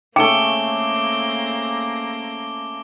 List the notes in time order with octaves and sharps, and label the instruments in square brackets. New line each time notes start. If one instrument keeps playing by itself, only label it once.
[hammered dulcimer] C#3 A3 [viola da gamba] A#3 C4 [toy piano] G5 [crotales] D6 D7 G7